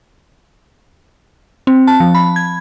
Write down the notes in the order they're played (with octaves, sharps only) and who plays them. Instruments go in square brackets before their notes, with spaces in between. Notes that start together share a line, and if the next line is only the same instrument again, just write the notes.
[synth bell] C4
A5
F3
B5
G#6